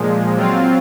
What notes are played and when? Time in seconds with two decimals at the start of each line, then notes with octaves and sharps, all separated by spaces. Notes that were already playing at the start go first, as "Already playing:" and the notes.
Already playing: A#2 F3 G#3
0.36 F#3 C4 F4